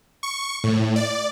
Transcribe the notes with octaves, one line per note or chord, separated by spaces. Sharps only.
C#6
A2
D5